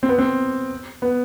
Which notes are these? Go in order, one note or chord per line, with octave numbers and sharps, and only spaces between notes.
C4
B3
C4
B3